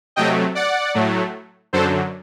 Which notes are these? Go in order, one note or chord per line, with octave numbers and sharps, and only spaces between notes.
C3 F#3 A3 D#5 G5
D5 F#5
A2 F#3 A3
F#2 D3 F#3 A4 C5